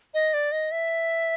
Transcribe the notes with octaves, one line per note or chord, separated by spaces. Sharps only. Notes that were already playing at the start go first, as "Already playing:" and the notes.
D#5
D5
D#5
E5